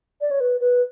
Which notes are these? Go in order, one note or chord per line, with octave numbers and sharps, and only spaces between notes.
D5
C#5
B4
B4